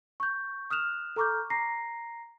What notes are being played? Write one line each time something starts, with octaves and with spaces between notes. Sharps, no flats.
C#6 G6
D#6 F6 F#6 E7 F7
A4 A#5 C#6 D6 F6 G6
A#5 A#6 C7